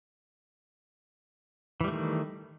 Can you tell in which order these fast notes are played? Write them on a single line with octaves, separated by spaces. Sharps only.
E3 G3 A3 D#3